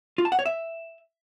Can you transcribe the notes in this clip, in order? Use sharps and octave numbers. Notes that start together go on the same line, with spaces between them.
F4
A5
F#5
C#5
E5